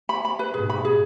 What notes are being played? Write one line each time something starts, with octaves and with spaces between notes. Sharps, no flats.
B5
B5
B4
G#2 B2 G#4
B5
G#4